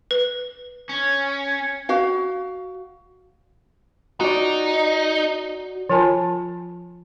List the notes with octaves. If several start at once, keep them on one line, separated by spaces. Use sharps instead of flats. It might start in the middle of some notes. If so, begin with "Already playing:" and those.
B4
C#4
F#4 F5
D#4 F#4 D5
F3 F4 A#4 G#5 A5 B5